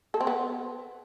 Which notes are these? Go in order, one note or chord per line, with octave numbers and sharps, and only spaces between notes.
A4
C4
B3